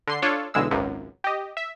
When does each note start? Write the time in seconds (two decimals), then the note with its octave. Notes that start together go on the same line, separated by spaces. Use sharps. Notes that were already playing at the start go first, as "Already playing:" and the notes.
0.07 D3 C6 C7
0.22 D4 F4 A4 C#5
0.54 B1 D3 E3 G#3 E6
0.71 G#1 C#2 F#2
1.24 G4 D#5
1.57 E5